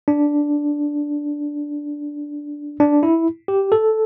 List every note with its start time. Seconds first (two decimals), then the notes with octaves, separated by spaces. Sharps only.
0.08 D4
2.80 D4
3.03 E4
3.48 G4
3.72 A4